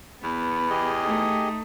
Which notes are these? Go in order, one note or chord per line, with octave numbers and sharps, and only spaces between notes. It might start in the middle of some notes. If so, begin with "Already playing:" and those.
E2 B3 B4
G4 G#4 D#5
A3 D#4